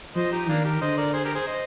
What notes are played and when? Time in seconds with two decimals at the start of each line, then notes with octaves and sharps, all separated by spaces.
0.16 F3 C5 D#5
0.32 D#4 G4
0.48 D#3 A#3 D4
0.64 G4 A#4
0.81 D3 C5 D#5
0.97 A#4 D5
1.13 G#4 C5
1.24 G4 A#4
1.35 G#4 C5
1.47 C5 D#5